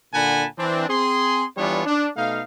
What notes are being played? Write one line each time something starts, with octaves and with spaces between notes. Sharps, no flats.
A#2 D3 F#5 G#5 A5 B5
E3 C4 D4
C4 G#4 C6
E3 G3 B3 D4 F4 C#5
D4
B2 A3 D#4 F5